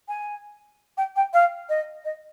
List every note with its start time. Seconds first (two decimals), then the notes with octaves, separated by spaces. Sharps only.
0.08 G#5
0.97 G5
1.16 G5
1.33 F5
1.69 D#5
2.05 D#5